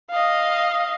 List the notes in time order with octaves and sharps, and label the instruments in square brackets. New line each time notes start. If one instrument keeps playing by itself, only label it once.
[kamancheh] D#5 F5